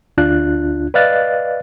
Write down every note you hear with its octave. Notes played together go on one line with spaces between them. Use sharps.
D2 D4 F4 F#6
B4 D5 D#5 F5 F#6 A6